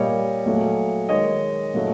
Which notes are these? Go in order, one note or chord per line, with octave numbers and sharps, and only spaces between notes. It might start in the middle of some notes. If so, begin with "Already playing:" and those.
Already playing: A#2 G3 A#3 C#5 D#5
A#2 F#3 A3
D#3 G#3 C#5 D#5
A#2 F#3 A3